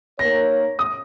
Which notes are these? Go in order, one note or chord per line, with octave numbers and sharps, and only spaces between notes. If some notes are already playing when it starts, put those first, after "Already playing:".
A#3 D#4 A#4 C#5 A#6
D#6